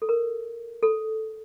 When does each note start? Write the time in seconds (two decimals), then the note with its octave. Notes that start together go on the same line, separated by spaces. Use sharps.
0.02 A4
0.09 A#4
0.83 A4